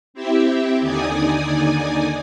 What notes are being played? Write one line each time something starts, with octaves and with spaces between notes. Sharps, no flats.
C4 E4 G4 E5
D#2 D3 D#4 D5 G#5 D#6